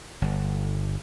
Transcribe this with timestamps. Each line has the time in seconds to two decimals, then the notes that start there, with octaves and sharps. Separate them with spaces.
0.22 G1